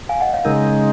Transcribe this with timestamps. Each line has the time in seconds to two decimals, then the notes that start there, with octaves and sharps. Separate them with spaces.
0.09 F5 G#5
0.21 D#5 F#5
0.34 C#5 F5
0.44 C#3 G#3 D#4 A#4 C#5